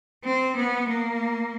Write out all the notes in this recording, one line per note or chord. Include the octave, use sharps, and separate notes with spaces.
C4
B3
A#3